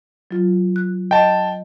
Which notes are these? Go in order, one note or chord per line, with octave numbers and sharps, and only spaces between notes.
F#3 F4
F#6
D#5 G5 A5